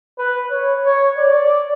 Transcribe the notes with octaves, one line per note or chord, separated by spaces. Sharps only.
B4
C#5
C#5
D5